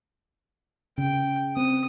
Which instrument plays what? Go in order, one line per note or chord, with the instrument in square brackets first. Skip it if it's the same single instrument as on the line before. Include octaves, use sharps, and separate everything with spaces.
[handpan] C#3 [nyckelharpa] G5
[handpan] C4 [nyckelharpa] D#6